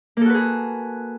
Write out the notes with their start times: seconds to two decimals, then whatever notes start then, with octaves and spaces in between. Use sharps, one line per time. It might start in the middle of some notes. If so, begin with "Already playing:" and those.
0.17 A#3
0.21 A4
0.26 F#4
0.30 B4
0.34 G#4